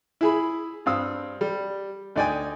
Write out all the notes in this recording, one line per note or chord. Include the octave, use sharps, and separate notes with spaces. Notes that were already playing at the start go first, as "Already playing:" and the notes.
E4 G#4 B5
G2 C4 F5 D#6 E6
G3
D2 D#4 D5 G5 G#5